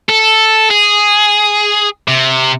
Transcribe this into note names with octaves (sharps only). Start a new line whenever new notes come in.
A4
G#4
C3